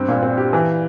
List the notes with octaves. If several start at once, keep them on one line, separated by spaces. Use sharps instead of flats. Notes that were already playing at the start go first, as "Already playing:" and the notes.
Already playing: G2 C4
A#2
C4
G4
E3